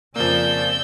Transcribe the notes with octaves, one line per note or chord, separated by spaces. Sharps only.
F2 C#3 F3 A#3 D5 E6 G6